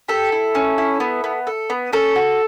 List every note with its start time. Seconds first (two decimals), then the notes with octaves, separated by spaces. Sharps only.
0.08 G4 A4
0.32 E4
0.55 C#4
0.78 E4
1.00 B3
1.24 B3
1.47 A4
1.70 B3
1.93 C#4 A4
2.16 F#4